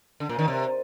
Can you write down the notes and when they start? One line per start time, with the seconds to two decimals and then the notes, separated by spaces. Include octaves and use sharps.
0.20 D3
0.29 A#2
0.39 D#3
0.48 C3